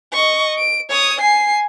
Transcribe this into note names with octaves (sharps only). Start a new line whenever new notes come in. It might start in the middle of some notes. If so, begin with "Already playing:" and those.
D#5 C#6
D7
C#5 D#6
G#5 C7